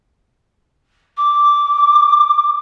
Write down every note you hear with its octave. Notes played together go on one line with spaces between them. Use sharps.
D6